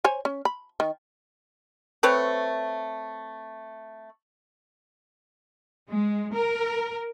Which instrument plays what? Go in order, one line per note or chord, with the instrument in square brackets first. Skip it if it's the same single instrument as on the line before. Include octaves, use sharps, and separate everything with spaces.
[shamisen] C5 C#5 G#5
C#4
B5
D#3
[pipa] A3 C4 B4 C#5
[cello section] G#3
A#4